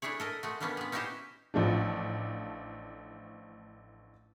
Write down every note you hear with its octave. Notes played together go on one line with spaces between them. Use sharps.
A3 D4 E4 G#4 C#5
A4 A#4 D#5
G#3 A3 F#4
D3 G3 A#3 B3 C#4 D4
G#3 B3
C#4 D#4 E4 F#4 G4 C5
A1 F3 A3 D4